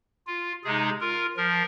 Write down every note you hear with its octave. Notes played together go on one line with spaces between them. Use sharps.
F4
C3 G#3 D#4 G#4
F4 A#4
F3 A#4